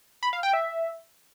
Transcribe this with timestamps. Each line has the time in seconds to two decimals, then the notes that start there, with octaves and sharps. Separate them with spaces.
0.23 B5
0.33 F5
0.43 G5
0.53 E5